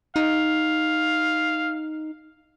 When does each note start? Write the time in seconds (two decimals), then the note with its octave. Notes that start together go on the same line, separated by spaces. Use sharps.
0.16 D#4 F5